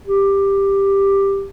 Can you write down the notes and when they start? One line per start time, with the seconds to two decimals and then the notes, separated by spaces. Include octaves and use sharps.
0.07 G4